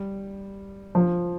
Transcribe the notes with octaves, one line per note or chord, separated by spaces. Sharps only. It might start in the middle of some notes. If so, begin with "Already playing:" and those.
Already playing: G3
F3